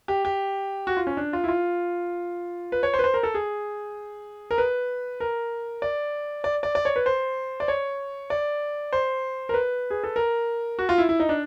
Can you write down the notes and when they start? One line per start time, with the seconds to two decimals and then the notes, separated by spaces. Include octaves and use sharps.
0.08 G4
0.25 G4
0.87 F#4
0.97 F4
1.07 C#4
1.17 D4
1.33 F4
1.44 E4
1.48 F4
2.72 B4
2.83 C#5
2.94 C5
2.99 B4
3.04 C5
3.14 A#4
3.23 A4
3.34 G#4
4.51 A#4
4.58 B4
5.20 A#4
5.82 D5
6.44 D5
6.63 D5
6.75 D5
6.85 C#5
6.96 B4
7.06 C5
7.60 D5
7.68 C#5
8.30 D5
8.93 C5
9.49 A#4
9.54 B4
9.90 G#4
10.04 A4
10.16 A#4
10.79 F#4
10.89 F4
10.98 E4
11.09 E4
11.20 D#4
11.29 D4